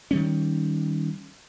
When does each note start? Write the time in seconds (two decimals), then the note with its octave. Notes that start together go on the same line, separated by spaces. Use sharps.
0.11 D#3 G3 C#4